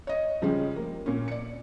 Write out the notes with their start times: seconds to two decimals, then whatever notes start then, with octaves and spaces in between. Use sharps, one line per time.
0.07 C#5 D#5
0.42 C#3 F3 G3 G#3 C#4
0.76 A#3
1.06 A#2 C#4
1.28 D5 C#7